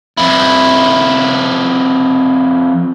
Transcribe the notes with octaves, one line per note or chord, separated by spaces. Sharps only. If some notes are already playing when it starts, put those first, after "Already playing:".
F2 E4